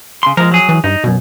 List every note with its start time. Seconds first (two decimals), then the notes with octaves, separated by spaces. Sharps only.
0.23 C#3 C6
0.37 F3 G#3 A#4
0.52 F#3 G#4
0.69 E3
0.84 G2 D#4
1.04 C2 F#2 B2